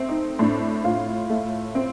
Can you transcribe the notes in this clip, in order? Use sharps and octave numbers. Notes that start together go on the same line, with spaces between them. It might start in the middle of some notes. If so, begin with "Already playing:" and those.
Already playing: A3 C4
D#4
A2 D4
A2 F4
A3
C4